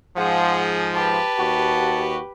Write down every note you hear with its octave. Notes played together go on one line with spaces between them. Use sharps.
G#2 F3 G#4 F#5
G4 B4 A5
D#2 F#4